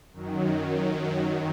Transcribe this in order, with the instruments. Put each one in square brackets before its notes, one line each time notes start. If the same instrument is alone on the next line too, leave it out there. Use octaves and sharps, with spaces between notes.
[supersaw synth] F#2 D#3 F#3